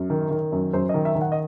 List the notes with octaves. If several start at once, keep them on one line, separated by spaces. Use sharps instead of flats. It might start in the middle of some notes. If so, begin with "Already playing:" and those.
Already playing: F#2
D#3
D#3
F#2
F#2 C5
D#3 D#5
E5
D#3
F#5
D#5